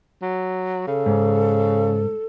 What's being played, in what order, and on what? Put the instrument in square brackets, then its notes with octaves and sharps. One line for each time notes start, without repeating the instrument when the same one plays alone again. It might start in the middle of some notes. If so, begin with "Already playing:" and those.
[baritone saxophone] F#3
[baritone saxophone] C#3 [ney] A4
[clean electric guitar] G#2